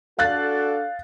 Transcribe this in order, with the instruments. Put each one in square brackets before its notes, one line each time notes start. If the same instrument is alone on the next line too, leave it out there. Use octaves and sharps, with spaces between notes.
[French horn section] D4 F#4 A4 [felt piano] F5 F#6 A6